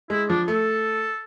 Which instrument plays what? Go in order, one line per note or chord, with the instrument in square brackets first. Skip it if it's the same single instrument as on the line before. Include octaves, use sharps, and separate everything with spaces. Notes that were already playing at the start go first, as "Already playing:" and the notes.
[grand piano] G#3 [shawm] E4
[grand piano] F3 [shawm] D4
[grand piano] A3 [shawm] A4